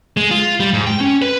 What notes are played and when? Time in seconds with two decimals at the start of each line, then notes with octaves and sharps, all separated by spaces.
0.17 G#3
0.31 F4
0.60 G3
0.74 G#2
0.86 G5
1.01 C#4
1.22 B4